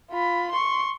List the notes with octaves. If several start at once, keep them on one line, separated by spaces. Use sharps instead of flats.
F4 B5
C6 C#6